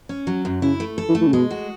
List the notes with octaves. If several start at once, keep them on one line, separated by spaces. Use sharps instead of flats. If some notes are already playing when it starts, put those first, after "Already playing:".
C#4
F#3
F#2
C#3 E4
A3
A4
E3
A3
E3
C#3
B2 G#3
F#4